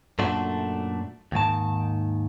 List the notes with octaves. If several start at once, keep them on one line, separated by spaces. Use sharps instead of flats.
F#2 A#2 A3 D4 F#4 A4
D#2 G#2 D#3 A5